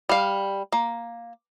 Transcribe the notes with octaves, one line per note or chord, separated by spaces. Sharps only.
G3 F5
A#3